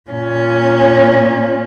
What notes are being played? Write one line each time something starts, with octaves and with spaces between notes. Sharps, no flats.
A#2 C#4